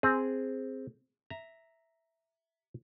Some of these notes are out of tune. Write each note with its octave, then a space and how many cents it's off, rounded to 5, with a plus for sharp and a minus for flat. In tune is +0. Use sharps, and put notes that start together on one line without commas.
C4 +0 G#4 +0
E5 +0 A#5 +0